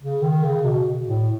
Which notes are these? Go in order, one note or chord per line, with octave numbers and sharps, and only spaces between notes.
C#3
D#3
C#3
B2
A2